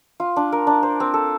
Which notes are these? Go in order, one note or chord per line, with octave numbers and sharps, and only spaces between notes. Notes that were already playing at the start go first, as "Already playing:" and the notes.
F4
D4
A#4
D4
C5
C4
A4